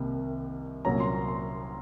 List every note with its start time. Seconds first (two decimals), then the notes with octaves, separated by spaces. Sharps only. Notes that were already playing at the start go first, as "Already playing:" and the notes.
Already playing: C2 C3 D#3 A#3
0.85 C2 A#2 F#3 A#3 C#4 A#5
1.00 C6
1.14 A#5
1.28 C6